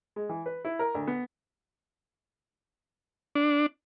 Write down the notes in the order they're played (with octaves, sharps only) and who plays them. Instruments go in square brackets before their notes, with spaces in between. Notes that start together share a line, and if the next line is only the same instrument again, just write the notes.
[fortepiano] G#3
E3
B4
E4
A#4
D2
B3
[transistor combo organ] D4